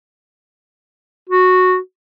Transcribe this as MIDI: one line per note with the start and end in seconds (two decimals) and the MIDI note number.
1.29 1.77 66